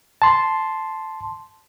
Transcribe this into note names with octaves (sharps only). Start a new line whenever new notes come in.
A5 C6